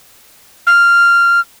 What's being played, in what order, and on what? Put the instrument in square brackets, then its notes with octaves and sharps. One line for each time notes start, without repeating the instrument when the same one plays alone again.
[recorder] F6